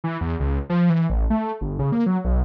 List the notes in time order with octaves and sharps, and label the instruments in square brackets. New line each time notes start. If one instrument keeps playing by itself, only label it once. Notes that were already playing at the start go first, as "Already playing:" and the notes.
[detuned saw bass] E3
E2
C#2
F3
E3
A1
A3
G1
C#3
A#3
F#3
B1